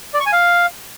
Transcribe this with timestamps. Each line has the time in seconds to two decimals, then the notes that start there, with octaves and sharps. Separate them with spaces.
0.14 D5
0.20 C#6
0.26 G#5
0.32 F5